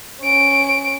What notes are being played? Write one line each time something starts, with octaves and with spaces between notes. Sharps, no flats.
C#4 D7